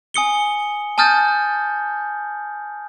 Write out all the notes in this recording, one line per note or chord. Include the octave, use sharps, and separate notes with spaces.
G#5 D#6 C#7 G7
G#5 A5 D#6 F6 G6 A6